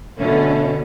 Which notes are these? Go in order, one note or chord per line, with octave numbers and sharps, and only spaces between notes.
B2 D3 A3 C#4